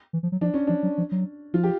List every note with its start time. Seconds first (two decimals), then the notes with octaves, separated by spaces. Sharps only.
0.13 E3
0.23 F3
0.32 F#3
0.41 F3 D4
0.54 C#4
0.67 F3 D4
0.83 F#3
0.98 F3
1.12 F#3
1.54 F3 F4
1.63 G4